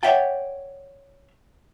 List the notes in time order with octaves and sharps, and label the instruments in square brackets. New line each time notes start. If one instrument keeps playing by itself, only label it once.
[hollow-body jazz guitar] C#5 D5 E5 F#5 G5 A5